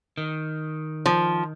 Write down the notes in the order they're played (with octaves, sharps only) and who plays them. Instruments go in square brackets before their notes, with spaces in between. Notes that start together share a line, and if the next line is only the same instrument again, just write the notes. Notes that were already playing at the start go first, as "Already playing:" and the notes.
[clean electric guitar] D#3
[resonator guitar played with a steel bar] F3